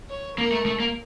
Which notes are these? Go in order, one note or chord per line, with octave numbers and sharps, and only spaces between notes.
C#5
A#3 A#4
A3
A3
A#3